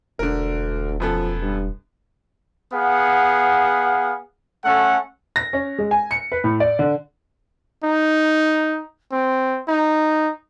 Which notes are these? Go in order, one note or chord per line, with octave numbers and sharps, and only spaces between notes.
E1 D2 D3 A#4
F#2 F3 B3 A4
G2
B3 G#4 F5 F#5
A3 C#4 A4 F#5
A#6
C#4
G#3
G#5
C#7
B4
A2
D5
D3
D#4
C4
D#4